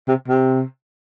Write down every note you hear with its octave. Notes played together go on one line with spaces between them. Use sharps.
C3
C3